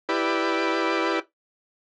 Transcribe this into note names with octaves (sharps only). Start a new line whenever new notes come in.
E4 G4 B4 D5